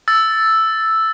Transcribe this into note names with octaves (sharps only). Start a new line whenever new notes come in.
E6 A6